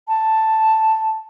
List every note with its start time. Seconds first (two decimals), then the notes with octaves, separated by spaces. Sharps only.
0.08 A5